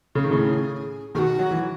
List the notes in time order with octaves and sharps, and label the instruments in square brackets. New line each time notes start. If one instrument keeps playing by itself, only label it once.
[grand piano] C#3 [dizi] A4
[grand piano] D#3 [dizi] G#4
[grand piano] A2 C#3
[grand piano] B2 D#3 [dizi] G#4
[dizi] F#4
[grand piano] F#3
E3